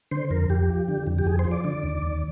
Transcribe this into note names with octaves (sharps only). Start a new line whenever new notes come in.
D3 C5
F2 A#4
F2 G4
F3
D3
F2
G4
F2 G#4
C5
F3
D5
D3 D5
D#2
D#2